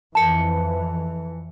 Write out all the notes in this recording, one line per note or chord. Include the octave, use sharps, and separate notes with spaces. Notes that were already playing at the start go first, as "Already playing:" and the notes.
F2 E3 A5 C#7